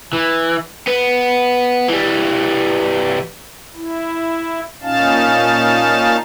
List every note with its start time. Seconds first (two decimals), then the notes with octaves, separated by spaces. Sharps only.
0.13 E3
0.87 B3
1.89 E3 G3
3.76 E4
4.82 A#2 C#4 D#4 F5 A5